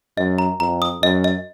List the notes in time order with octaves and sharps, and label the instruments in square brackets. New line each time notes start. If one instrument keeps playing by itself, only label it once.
[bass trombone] F#2 [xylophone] D#5
[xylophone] A#5
[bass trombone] F2 [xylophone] A#5
[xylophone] D#6
[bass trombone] F#2 [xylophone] D#5
[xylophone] D#5